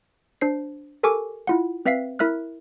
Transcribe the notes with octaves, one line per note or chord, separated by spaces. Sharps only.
D4 C5 C7
G4 A4 A#4 G#5 C#6 D6
E4 F4 F#5
C4 B4 E5 F5 B6 C7
E4 A#4 E5 F6 F#6